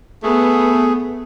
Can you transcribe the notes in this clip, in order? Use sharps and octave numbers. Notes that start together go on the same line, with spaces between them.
A3 B3 G#4